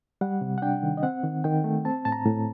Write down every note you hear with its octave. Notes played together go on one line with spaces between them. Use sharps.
G3 F#5
C3
F#5
D4 G5
D#3
D#5
C4 F#5
D#3
D#3 G5
A3
C4 A5
A2 A5
A#5
A2